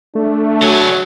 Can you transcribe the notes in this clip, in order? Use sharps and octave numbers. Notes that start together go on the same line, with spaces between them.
A3 D4
D3 F#3 G#5